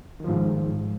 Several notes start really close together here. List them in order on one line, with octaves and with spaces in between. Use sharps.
D#3 F3 G#2